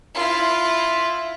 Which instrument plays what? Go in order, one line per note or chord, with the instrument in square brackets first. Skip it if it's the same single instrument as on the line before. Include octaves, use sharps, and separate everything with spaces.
[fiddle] E4 F4